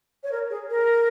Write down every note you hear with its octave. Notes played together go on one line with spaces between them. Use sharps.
C#5
A#4
G#4
A#4